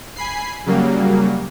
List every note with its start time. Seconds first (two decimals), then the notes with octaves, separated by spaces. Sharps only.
0.16 G#5 B5 C7
0.66 C#3 F#3 G3 A#3